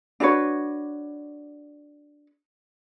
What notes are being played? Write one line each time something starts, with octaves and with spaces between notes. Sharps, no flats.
D4 F#4 B4 C#5